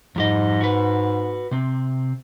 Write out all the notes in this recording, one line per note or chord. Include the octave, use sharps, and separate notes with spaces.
F2 G#2 G3 D#5
F#4 B4
C3 C4